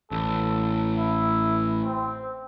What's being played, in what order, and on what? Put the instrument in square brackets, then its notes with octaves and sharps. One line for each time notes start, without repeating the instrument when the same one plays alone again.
[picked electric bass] A1 [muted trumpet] A4
[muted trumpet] E4
C4